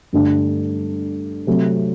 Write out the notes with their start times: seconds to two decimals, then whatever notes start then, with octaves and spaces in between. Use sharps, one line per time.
0.13 G2 D3 A3 D4
1.47 C3 F#3 A3